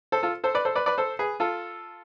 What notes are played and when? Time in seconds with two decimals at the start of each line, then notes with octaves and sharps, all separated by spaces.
0.12 A4 C5
0.23 F4 A4
0.44 A4 C5
0.55 B4 D5
0.65 A4 C5
0.76 B4 D5
0.86 B4 D5
0.98 A4 C5
1.19 G#4 B4
1.40 F4 A4